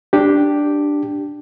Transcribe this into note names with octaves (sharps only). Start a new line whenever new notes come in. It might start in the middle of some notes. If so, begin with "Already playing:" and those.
D4 G4